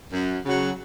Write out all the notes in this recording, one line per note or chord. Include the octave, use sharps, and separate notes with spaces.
F#2
C#3 F#3